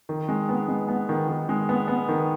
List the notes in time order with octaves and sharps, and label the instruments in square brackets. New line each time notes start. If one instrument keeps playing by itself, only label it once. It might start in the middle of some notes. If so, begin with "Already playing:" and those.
[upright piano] D#3
G#3
B3
G#3
B3
D#3
D#3
G#3
B3
B3
D#3